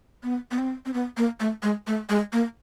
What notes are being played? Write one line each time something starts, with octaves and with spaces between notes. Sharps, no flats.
B3
B3
C4
C4
B3
A#3
A3
G#3
A3
G#3
A#3